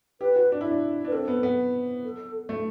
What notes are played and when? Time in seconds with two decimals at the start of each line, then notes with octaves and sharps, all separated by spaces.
0.21 G4 B4
0.36 F#4
0.52 D4
0.61 E4
0.71 D4
1.05 D4
1.07 B4
1.12 C4 A4
1.28 B3
1.43 B3
2.04 A4
2.49 A3